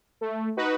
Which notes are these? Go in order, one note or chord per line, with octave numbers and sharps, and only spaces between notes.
A3
D#4 F#4 B4